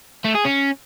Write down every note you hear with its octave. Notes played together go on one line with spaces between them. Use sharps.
A3
G#4
C#4